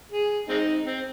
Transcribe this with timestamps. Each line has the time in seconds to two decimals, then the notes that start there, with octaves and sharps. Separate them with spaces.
0.12 G#4
0.49 G#3 C4 D#4
0.86 C4